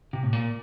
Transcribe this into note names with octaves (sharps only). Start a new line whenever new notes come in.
C3
A2
A#2